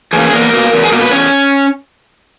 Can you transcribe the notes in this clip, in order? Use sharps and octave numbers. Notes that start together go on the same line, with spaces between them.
E3 A#3 C#4 G#4
G#4
E2 A#3 A#4
B2 A#3
E2
G#4
B2 A#3 A#4
B4
E2 C#4 C#5